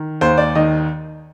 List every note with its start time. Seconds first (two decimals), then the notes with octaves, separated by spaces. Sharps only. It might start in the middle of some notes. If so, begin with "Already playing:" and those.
Already playing: D#3
0.21 D#2 C5
0.38 D5
0.55 D#3 D#5